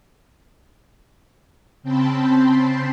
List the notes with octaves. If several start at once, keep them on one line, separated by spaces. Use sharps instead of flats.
C#3 C4 G5 A5 B5 C6